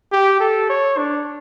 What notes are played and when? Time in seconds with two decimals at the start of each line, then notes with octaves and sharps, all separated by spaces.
0.12 G4
0.40 A4
0.70 C#5
0.98 D4